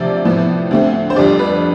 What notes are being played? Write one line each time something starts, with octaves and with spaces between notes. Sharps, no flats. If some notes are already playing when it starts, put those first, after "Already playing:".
Already playing: D2 C3 F3 D5
A2 F3 B3
D2 D3 A3 C4
C5
F2 D3 G3 D5
B4